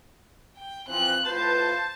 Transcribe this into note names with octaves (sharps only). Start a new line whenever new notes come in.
G5
E3 F3 C4 F#6
A2 F4 B4 C5 A5